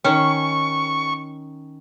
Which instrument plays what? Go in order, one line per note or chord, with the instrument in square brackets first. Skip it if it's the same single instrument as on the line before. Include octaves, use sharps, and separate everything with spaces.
[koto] D#3 C#4 [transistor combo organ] C#6